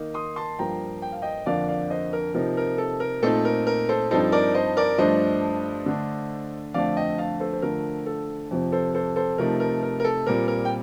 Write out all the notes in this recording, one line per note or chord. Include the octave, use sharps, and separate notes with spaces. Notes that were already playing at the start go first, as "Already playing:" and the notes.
Already playing: D#3 A#3 D#4
C6 D#6
A5 C6
G2 F3 A#3 G5 A#5
G5
F5
D#5 G5
F2 D3 F3 A#3 D5 F5
D5 F5
C5 D#5
A#4
C3 F3 A#3 D#4 A#4
A#4
A4
A#4
A#2 A3 C4 D#4 A4 C5
A#4
A#4
A4 C5
G2 F3 C4 D#4 A4 C5
A#4 D5
C5 D#5
A#4 D5
G2 F3 A3 D4 C5 D#5
D3 A3 D4
F2 D3 A3 C4 D5 F5
D#5 G5
F5 A5
A4 C5
C5
D3 F3 A3 A#4
A4
F2 C3 F3 C4
A4 C5
A4 C5
A4 C5
C3 F3 A3 D#4 A#4
A#4
A#4
A#4
A4
A#2 G3 C4 A#4
A#4
G5